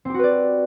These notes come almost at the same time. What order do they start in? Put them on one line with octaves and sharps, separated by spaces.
C4 G4 F#4 B4 D5